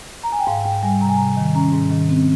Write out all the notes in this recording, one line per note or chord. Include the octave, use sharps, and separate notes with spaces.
A#5
G#5
G5
G#2 F5
G#2 G5
G3 G#5
C3 A#5
G#5
C3 A#5
G#5
D#3
C#4 A#5
G#2
D#3
C4